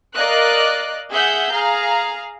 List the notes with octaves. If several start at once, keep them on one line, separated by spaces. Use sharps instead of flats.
A#4 D5 D#5 F5 F#6
G#4 E5 F#5 G6
G#4 F5 A#5